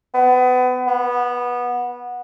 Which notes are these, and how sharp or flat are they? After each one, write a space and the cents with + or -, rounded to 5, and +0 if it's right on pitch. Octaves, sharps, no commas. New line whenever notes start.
B3 +30
B3 -15